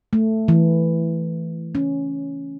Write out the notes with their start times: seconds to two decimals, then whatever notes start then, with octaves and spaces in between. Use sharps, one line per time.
0.13 A3
0.48 E3
1.75 C#4